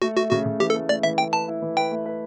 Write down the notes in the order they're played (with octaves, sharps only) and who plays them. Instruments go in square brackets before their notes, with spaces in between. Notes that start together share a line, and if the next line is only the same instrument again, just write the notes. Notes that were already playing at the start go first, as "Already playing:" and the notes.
[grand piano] A3 [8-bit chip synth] F#4
[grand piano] A3 [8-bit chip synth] F#4
[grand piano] C#3 [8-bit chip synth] F#4
[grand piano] C#3
[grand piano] E3 [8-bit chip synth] G4
[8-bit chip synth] A4
[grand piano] A3
[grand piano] A3 [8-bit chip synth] D5
[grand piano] E3 [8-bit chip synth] E5
[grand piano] A3 [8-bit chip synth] G5
[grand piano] B4 [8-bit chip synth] A5
[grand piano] E4
E3
[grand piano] B4 [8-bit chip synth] G5
[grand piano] A3
B4